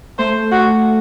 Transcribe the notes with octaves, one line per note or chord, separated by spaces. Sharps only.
A3 C5
F#4